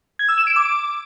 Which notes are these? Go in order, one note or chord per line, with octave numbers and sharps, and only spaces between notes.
G#6
E6
E7
D7
D6